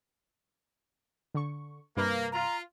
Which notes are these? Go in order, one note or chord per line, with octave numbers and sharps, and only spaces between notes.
D3 C#6
G2 C3 A#3 B4
F4 A#5